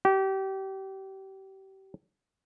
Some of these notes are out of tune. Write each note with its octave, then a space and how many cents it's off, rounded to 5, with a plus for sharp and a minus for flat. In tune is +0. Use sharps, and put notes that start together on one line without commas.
G4 -30